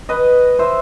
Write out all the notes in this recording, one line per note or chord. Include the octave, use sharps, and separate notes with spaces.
B4 D#5
C5 E5